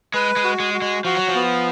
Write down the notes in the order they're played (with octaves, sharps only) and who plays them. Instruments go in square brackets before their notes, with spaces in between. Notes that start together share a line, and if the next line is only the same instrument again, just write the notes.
[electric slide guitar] G#3 [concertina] B4
[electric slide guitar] G#3
[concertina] F#4
[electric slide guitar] G#3
[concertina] F#4
[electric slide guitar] G#3
[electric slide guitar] F3 [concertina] F#4
[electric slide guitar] F#3
F3
[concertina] B3